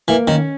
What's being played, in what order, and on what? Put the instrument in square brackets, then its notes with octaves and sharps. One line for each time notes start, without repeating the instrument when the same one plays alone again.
[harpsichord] E3 [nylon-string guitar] A#3
[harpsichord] D#3 [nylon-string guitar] C#4